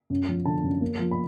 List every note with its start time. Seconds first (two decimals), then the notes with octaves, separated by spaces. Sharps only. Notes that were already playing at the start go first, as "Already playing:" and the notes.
0.10 F#2
0.29 F3
0.46 D3 A5
0.63 F#2
0.81 A#3
0.99 F3
1.11 B5